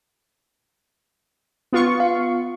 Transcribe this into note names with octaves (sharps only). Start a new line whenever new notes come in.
B3 F4 C#6
F5